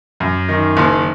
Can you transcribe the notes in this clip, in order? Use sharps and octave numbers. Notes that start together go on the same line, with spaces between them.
F#2
D#3
F#1